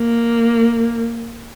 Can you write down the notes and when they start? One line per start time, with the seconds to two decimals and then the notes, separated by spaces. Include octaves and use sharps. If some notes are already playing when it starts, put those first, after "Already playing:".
Already playing: A#3